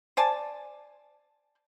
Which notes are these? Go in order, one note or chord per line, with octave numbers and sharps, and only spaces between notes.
C5 D5 G#5 A5